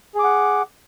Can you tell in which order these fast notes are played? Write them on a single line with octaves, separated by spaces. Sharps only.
G#4 D6 F#5